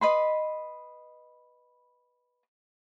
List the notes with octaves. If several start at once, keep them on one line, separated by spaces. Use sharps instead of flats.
B4 D#5 B5 C6